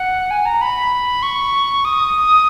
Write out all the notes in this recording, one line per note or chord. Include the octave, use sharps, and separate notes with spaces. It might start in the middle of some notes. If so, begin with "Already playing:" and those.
Already playing: F#5
G#5
A#5
B5
C#6
D#6